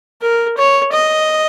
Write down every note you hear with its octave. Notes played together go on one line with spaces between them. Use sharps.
A#4
C#5
D#5